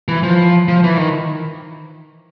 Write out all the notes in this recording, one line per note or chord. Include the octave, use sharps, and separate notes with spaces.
E3
F3
F3
E3
D#3